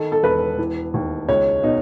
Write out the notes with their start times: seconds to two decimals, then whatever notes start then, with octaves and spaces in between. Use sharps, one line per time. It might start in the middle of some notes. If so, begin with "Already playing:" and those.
Already playing: D#3 A4
0.12 A4
0.23 E1 B4
0.58 E3
0.94 D#2
1.29 C#2 C#5
1.63 B2 D#4